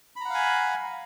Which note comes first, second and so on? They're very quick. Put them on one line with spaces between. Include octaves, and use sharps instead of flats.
B5 A#5 F#5 F5 G#5